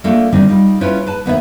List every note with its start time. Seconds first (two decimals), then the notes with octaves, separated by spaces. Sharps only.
0.04 A3 A#3 D4 F4 A4 A#4
0.32 D3 D#3 G3 C4 D4 D#4
0.47 G3 D#4 F4
0.81 C#4 E4 F4 B4 C#5
1.07 B4 A5
1.26 D#2 B3 C#5 E5